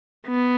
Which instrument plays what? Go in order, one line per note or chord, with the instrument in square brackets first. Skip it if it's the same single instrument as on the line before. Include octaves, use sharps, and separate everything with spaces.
[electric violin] B3